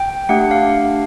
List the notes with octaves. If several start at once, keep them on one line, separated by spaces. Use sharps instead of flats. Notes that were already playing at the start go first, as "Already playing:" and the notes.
Already playing: G5
A3 D4 G4 F#5
F5